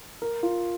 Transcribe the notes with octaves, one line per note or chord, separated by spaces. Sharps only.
A#4
F4